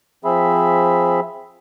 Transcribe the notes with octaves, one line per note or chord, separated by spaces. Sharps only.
F3 C4 G#4 E5 B5